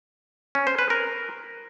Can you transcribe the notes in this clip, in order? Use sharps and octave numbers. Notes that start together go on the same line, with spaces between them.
C#4
C5
B4
A#4